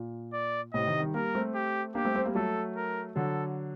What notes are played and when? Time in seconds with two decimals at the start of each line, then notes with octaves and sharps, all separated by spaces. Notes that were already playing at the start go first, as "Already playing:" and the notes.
Already playing: A#2
0.33 D5
0.74 A2 C3 D#5
0.87 C3 D#3
1.00 D#3 G3
1.14 G3 A#3 A#4
1.35 A3 C4
1.55 G4
1.95 A#3 D4 G4
2.05 A3 C4
2.15 A3 C4
2.25 G3 A#3
2.35 F#3 A3 A4
2.76 A#4
3.16 D3 F#3 A4